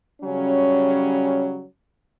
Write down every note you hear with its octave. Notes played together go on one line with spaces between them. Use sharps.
C#3 F#3 G3 C#4